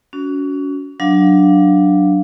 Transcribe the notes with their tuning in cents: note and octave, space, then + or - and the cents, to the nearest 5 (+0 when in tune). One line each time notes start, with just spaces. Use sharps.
C#4 +35 F#4 +0
F#3 +0 D4 +0 F5 +0